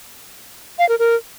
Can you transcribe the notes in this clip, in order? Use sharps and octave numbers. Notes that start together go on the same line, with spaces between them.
F5
A#4
A#4